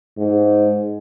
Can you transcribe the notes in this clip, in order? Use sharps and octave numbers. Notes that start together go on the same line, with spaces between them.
G#2